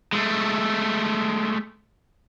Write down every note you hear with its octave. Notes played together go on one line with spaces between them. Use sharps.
G#3 A3